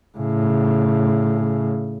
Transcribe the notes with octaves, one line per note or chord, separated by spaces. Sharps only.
A2 C#3